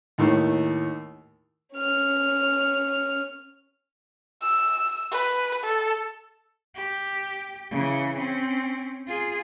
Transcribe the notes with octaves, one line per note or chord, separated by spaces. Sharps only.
D#2 A2 D#3
C#4 F6
E6
B4
A4
G4
C#3 E3
C4 C#4
F4 G#4